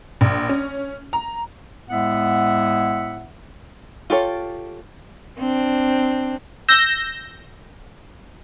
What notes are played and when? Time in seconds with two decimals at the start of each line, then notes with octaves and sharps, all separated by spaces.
0.21 A#1
0.49 C#4
1.13 A#5
1.89 A2 G#3 B3 E5 F#5
4.10 F4 G4 A4 C#5
5.39 C4 D4
6.69 E6 G6 A#6